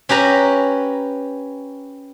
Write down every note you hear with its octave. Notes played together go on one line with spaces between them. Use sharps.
C#4 G4 B4 A#5